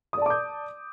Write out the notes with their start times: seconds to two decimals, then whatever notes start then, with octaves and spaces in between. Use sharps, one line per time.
0.13 D#6
0.17 D5
0.22 A5
0.26 D6
0.30 G6